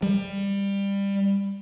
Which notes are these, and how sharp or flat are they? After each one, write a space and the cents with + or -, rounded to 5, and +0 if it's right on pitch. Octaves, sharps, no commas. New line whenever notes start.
G3 +20